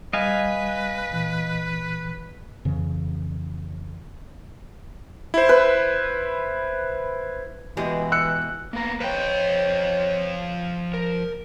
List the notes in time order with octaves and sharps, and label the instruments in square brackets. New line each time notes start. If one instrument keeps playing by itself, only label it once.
[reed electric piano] G3 [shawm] B4 [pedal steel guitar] D#5 F5 G#5
[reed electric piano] A#2 E3
[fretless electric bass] F2 C#3 E3
[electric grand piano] E4 C5
[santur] B4
[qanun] B2 G#3 G4 [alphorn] E3
[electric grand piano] E6 F#6 C#7
[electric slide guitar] A#3 B3 A#5
[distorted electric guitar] F3 G5 [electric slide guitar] B4 C#5
[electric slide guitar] A#4